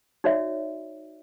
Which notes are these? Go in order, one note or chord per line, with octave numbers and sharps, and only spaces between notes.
D#4 F#4 C#5 D5 E5